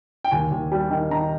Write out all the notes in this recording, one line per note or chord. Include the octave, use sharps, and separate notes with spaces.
G5
D#2 G#5
D#2
G3
D#3
D#3 A#5